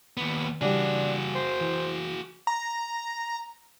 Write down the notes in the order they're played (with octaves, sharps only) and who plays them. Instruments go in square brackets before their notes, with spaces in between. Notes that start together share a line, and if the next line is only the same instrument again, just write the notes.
[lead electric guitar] D#2 B3
[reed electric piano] C#3 E3 G3 [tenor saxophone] D4 [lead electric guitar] F#4 G#4
[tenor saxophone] C5
[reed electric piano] E3
[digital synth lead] A#5